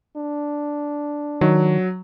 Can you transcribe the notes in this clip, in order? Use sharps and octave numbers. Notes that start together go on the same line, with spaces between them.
D4
D#3 F#3